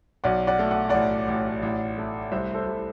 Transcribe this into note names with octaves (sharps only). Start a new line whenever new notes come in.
B1 D5 F#5
D5 F#5
A3
F#5
A1 D5 F#5
A1
A1
A3
C2 C5 E5
A4 C5
C2